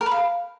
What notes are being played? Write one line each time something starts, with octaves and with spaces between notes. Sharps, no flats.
A#4
B4
F5